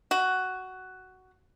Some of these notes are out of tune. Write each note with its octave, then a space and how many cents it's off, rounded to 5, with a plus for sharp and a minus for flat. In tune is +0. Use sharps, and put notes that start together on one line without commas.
F#4 +10